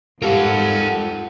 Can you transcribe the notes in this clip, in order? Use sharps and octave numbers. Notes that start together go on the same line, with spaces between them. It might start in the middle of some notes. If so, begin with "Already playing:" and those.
G#2 F4 G4 A4 A#4 F5 F#5